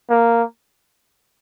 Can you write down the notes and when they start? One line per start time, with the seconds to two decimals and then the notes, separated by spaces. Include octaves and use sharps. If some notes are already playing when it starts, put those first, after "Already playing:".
0.10 A#3